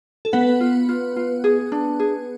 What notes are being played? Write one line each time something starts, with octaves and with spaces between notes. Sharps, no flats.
A4
B3 B4 F#5
F4
F4
F4
G#4
D4
G#4